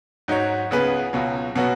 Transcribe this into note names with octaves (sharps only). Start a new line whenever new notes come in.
G#2 F#3 D#4 F#4 C#5
C#2 C#3 B3 G#4 B4
C#2 B2 F#3
B2 F#3 B3 F#4